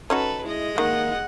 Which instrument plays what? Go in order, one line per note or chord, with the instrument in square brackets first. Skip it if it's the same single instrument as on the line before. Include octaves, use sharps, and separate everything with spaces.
[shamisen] C#4 D#4 F#4 [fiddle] A4 B4
[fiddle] G#3 D#5 [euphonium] E4
[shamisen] D#3 [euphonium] A#3 [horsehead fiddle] F#5